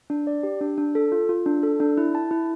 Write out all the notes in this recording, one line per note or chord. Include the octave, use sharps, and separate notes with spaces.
D4
D5
G4
D4
D4
A4
F4
F4
D4
A4
D4
E4
A5
E4